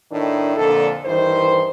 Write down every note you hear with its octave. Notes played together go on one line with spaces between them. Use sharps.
A2 D#3 D4
F2 A#2 D3 A4
G2 D#3 E3 C5